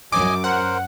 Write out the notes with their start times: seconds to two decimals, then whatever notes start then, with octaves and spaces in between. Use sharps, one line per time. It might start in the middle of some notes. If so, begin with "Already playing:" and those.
0.12 F#2 D#5 G#5 D6
0.44 A#4 C5 F#5